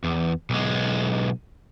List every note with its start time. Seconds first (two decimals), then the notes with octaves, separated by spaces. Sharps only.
0.04 E2
0.50 B1 G#3